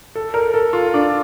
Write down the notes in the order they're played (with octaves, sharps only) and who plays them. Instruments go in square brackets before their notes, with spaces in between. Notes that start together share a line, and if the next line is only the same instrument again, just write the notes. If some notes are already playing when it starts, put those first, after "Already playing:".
[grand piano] A4
A#4
A4
F4
D4